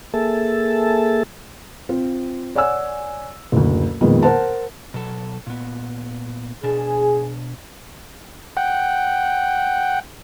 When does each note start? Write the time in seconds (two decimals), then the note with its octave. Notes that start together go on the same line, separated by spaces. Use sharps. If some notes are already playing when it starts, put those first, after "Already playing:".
0.14 A#3 G#4 A4 E5 A5
1.89 C4 F4
2.55 C#5 D5 F#5 G#5 E6
3.52 F#1 D2
4.01 F2 A#2 D#3 G#3 B3
4.23 A#4 C5 F#5 A5
4.94 B2 F#3 A4
5.47 A#2 B3
6.63 B2 D4 G#4
8.57 F#5 G5